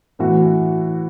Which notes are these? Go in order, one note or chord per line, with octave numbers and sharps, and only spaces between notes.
A2 E3 F#4